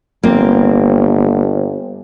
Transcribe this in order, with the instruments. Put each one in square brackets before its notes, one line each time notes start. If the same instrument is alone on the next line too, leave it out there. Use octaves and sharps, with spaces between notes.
[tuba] G1 [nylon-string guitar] A#3 C4